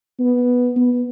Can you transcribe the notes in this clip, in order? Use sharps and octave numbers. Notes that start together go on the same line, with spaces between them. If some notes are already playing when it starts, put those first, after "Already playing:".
B3
B3